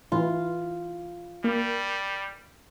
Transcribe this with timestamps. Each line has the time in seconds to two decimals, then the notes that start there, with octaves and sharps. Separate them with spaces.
0.12 E3 F4
1.44 G3 A#3